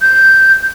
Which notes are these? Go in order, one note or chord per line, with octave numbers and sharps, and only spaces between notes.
G6